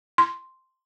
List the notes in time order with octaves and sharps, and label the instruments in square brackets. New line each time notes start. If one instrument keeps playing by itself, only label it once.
[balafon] C6